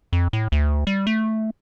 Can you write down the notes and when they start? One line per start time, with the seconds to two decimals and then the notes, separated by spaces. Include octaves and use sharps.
0.13 F2
0.33 A2
0.52 D2
0.87 G3
1.07 A3